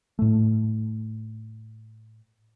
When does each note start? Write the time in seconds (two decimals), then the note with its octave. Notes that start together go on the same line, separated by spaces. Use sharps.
0.19 A2 A3